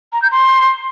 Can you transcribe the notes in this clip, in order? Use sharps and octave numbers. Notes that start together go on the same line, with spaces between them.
A#5
G6
C6